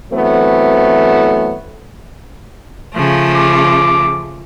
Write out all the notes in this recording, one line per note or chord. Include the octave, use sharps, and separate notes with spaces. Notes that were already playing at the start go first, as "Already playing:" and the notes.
E3 F#3 A3 B3 C4
C#3 F3 A3
D6